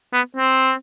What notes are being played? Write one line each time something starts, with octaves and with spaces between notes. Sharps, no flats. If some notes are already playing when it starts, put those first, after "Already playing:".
B3
C4